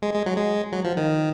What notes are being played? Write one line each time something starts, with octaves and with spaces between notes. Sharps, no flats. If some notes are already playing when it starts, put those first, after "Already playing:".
G#3
G#3
F#3
G#3
F#3
F3
D#3